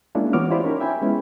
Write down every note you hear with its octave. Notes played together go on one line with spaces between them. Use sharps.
G#3 A#3 C#4 D4 E4 F4
E3 B3 F#4 C#5 D6 F6
E4 F4 G4 C5 D5 B5
C#4 D#4 A#4 C#5
E5 G5 G#5 B5
G#3 B3 C#4 E4 B4